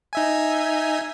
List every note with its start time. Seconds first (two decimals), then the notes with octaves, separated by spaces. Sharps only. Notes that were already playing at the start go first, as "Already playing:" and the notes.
0.13 D#4 E5 G#5